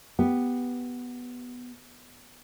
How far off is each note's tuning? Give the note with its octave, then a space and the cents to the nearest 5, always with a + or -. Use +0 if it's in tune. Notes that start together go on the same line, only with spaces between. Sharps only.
B3 +0 G4 +0